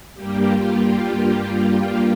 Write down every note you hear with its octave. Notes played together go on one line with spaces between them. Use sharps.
G2 G3 A#3 G4
F4
G4